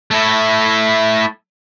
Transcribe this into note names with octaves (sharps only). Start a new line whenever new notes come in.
A3 E4